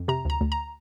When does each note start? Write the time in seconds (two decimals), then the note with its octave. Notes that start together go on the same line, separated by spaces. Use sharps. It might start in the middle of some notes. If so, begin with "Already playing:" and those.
Already playing: F2
0.08 C3 A#5
0.25 D2 A#5
0.41 D2
0.52 A#5